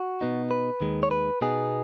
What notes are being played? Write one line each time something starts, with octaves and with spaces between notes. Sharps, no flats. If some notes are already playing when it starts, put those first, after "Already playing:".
Already playing: F#4
B2 B3 D#4
B4
D#2 D#3 G#3
C#5
B4
B2 B3 D#4 G#4